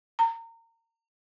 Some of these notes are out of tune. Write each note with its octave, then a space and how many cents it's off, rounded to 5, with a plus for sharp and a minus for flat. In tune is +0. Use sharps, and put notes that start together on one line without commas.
A#5 -30